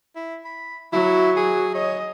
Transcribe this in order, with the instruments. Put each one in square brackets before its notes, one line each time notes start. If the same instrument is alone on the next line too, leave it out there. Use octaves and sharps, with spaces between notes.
[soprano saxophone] E4
B5
[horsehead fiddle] F#3 [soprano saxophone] E4
[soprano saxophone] G#4
[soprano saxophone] C#5 [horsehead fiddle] D#5